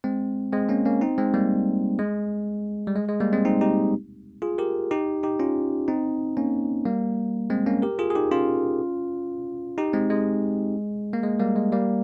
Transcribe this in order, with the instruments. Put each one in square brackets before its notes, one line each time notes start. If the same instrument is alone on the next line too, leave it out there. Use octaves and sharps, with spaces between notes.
[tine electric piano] G#3 C4
G#3 C4
A#3 C#4
A#3 C#4
C4 D#4
G#3 C4
G3 A#3
G#3
G3
G#3
G#3
G3 A#3
G#3 C4
C4 D#4
D#4 G4
F4 G#4
G4 A#4
D#4 G4
D#4 G4
C#4 F4
C4 D#4
A#3 C#4
G3 A#3
G#3 C4
A#3 C#4
G4 A#4
F4 G#4
G#4
D#4 G4
C#4 F4
D#4 G4
G#3 C4
G#3
A#3
G#3
G3 A#3
G#3
G3 A#3